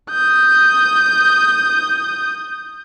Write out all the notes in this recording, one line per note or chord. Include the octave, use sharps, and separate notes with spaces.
D#6 G6